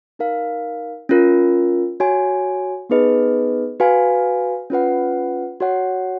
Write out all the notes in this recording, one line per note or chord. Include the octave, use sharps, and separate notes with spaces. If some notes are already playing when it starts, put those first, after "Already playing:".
D#4 A#4 F5
C#4 F4 A#4
F#4 C#5 G#5
B3 D#4 G#4 B4 D#5
F#4 B4 F5 G#5
C#4 F4 B4 F#5
F#4 C#5 F#5